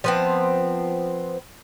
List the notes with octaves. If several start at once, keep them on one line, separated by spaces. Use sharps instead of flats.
F3 B3 C4